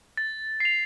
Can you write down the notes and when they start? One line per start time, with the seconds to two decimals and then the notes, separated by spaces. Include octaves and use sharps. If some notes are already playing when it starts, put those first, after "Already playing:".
0.17 A6
0.60 C7 F7